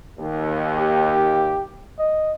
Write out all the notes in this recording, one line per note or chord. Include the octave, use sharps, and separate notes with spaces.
D#2
G4
D#5